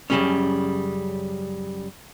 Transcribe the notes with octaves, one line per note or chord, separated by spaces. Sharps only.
F#2 C#3 E3 G3 G#3 C#4